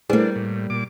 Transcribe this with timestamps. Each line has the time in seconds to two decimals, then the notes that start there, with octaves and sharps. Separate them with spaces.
0.10 G3 A3 A#3 D4 E4 G#4 B4 C5
0.36 A2
0.70 A#2 D6